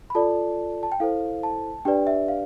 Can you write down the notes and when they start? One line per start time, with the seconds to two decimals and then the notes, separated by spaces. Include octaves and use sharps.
0.10 B5
0.15 F4 A4 D5 A5
0.83 A5
0.92 G5
1.00 E4 A4 C5 F5
1.43 A5
1.85 D4 G4 B4 D5 G5
2.07 E5
2.28 F5